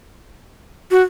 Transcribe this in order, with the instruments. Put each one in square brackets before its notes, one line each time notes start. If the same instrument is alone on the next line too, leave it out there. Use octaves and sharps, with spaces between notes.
[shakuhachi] F#4